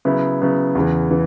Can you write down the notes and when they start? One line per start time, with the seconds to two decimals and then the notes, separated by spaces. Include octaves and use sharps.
0.05 C#3 F#3 B3 E4
0.40 C#3 F#3 B3 E4
0.75 E2 C#3 E3
1.10 C#3 E3